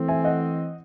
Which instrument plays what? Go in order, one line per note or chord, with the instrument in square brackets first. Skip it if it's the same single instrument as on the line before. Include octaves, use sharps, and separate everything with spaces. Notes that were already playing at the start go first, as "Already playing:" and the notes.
Already playing: [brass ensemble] E3 A3 C4
[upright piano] E5 G#5
D#5 F#5